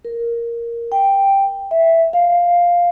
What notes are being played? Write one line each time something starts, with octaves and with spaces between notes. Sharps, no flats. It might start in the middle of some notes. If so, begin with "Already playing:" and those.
A#4
G5
E5
F5